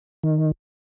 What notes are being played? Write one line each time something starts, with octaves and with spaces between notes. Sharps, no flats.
D#3